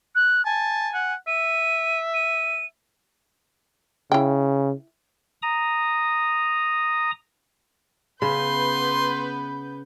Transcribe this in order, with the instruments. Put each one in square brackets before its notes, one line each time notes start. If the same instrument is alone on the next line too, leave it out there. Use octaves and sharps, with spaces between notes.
[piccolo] F#6
[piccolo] G#5 [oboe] A5
[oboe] F#5
[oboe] E5 [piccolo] D#7
[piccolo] D#7
[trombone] C#3 [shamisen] E4 G5
[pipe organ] A#5 D#6
[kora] C#3 [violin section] B3 B4 G6 [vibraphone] B5 [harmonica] C6